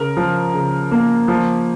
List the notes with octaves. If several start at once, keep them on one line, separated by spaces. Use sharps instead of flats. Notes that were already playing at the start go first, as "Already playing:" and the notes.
Already playing: C#3 A#4
F3
C#3
A#3
F3